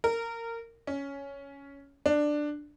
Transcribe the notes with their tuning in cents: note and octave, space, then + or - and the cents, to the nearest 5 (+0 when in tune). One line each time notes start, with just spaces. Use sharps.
A#4 -20
C#4 +10
D4 +10